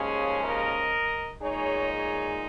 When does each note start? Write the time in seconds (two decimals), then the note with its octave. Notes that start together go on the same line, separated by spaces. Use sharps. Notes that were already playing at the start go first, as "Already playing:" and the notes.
Already playing: D#2 C#3 F3 G#3 C#4 G#4 C#5
0.44 A#4 D#5
1.42 A#2 G#3 D#4 G#4 C#5
1.92 G#4 C#5